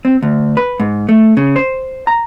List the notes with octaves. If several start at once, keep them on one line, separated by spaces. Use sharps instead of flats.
C4
D2
B4
G#2
A3
C#3
C5
A#5